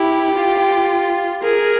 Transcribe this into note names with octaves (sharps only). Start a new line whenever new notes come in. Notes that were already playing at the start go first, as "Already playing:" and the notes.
Already playing: E4 G4
F4
G#4 A#4